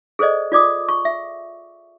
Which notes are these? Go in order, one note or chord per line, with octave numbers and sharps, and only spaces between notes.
G#4 A4 C5 D5 D#5
F4 D5 D6 D#6
C#6
E5